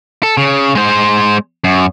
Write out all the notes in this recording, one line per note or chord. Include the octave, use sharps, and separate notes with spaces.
A4
C#3
G#3 C5
F#2